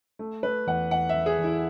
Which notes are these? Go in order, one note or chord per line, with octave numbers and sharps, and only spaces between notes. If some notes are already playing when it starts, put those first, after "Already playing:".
A3
A3 B4
E2 F#5
E2 F#5
E5
E2
G#4
E2
E4